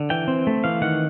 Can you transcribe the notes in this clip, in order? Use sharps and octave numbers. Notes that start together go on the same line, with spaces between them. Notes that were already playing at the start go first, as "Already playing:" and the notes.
Already playing: D3
E3 G5
C4
A3
E3 F5
D#3 F#5